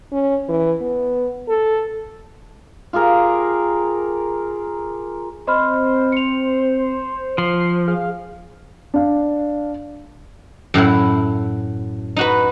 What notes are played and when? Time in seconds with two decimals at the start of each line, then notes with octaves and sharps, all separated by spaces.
0.12 C#4
0.49 E3
0.81 B3
1.48 A4
2.93 F4 G4 G#4 A#4
5.47 C4 C5 D#5 B5 F6
6.12 C#7 F7
7.38 F3 C5 C7
7.88 G#4 F5
8.94 D4 F5
10.74 F#2 A2 F#3 E4
12.17 D#4 F#4 B4